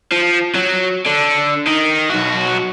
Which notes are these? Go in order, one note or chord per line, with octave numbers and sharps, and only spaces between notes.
F3
F#3
D3
D#3
B1 F#4